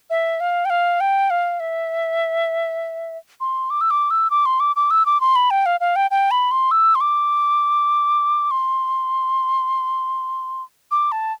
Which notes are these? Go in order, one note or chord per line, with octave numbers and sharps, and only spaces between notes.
E5
F5
G5
F5
G5
F5
E5
C6
D6
E6
D6
E6
D6
C6
D6
D6
E6
D6
C6
B5
G5
F5
F5
G5
G5
B5
C6
E6
C6
D6
C6
D6
A5